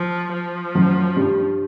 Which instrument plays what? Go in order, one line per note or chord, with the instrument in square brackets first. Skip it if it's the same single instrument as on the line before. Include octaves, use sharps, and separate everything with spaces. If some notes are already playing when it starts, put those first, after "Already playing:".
Already playing: [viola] F3
F3
[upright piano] F#2 F#3
G2 G3